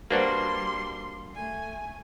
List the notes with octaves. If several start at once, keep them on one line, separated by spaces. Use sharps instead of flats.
G3 A#3 D4 F#4 B4 C5 C6
A3 G#5